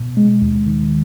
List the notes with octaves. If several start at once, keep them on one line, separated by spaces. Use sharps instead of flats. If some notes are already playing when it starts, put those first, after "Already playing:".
Already playing: B2
G#3
D#2
D#3